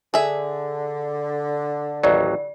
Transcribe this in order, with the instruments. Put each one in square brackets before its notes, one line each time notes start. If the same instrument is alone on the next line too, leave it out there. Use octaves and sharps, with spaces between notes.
[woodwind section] D3 [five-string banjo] G#4 E5
[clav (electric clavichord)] A1 D#2 F#3 [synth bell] D5